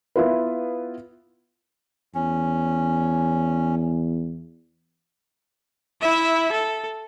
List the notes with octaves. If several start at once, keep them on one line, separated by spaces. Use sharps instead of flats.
B3 E4 F4 B4
E2 C#4
E4 E5
A4